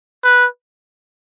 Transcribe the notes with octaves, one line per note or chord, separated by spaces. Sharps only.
B4